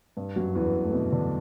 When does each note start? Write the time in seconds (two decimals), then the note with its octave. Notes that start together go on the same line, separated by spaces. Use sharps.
0.17 G2
0.36 F#2 F#3
0.55 E2 E3
0.84 A3
0.93 B2 B3
1.12 D3 D4